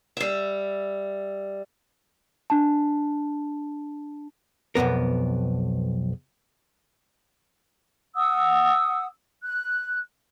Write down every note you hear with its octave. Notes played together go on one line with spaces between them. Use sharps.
G3 E5
D4 A5
B1 F2 G#2 B3 A#4
F#5 D#6 E6
F#6